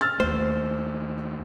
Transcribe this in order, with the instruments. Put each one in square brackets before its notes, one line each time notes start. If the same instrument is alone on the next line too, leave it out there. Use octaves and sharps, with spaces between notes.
[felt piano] E6 F6 A6
[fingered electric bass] D#2 A3 [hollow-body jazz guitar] C5